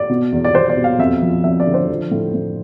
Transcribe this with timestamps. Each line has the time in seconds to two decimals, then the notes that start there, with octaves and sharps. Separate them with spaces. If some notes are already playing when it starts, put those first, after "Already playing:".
Already playing: D5
0.10 B2
0.32 E2
0.45 D5
0.54 E2 C5
0.69 D5
0.77 B2
0.84 F5
0.99 F2 E5
1.22 F3
1.44 F2 E5
1.60 D5
1.66 D3
1.74 C5
1.89 F3
2.11 A2
2.34 A2